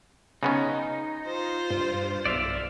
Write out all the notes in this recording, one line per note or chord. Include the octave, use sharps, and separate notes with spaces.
C#3 B3 C#4 D#4
F4 C5
G2
B1 D5 E5 F5